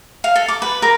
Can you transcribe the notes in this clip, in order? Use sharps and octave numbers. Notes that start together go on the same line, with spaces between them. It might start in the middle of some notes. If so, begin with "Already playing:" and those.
F5
A4
D6
B4
A#4